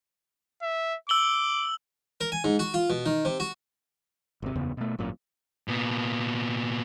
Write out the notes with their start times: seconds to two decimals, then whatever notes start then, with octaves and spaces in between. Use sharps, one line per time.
0.62 E5
1.09 D6 E6 F#7 G7
2.21 A#4
2.32 G#5
2.44 G#2
2.59 F#4
2.74 F4
2.90 B2
3.06 D#3
3.25 C3
3.40 F#4
4.42 G#1 C3
4.55 F#1 E2 C#3 B3
4.77 B2 A3
4.98 G#1 F#2 A#2
5.68 A#2 B3